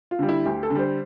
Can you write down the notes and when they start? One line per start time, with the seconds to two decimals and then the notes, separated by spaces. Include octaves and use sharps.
0.11 F4
0.19 D3 G3
0.29 E4
0.45 D2 G4
0.63 A4
0.70 D3
0.75 G3 C5